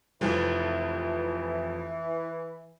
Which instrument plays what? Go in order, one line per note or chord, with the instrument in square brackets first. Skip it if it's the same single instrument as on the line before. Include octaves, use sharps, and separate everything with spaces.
[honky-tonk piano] F1 F2 F3 [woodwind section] E3